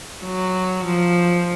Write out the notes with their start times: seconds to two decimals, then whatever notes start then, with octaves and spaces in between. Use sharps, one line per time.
0.24 F#3
0.85 F3